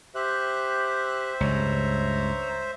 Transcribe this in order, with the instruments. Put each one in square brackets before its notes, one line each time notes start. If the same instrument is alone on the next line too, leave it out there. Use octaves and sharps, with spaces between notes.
[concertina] G4 F#6 [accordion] C5 E5
[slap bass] C#2 G2 [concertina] C#5 A#5